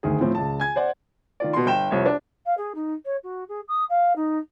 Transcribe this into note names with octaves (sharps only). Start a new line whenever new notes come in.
D2 D#3 G#4
A2 F3 C4
C#2 A5
G#5 G#6
C5 D5 F#5
D#3 F4 D5
B2 C6
G1 G5 E7
C2 F2 C#5
D4
F5
G#4
D#4
C#5
F#4
G#4
D#6
F5
D#4